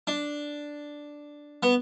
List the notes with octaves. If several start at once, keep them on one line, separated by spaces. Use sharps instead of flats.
D4
B3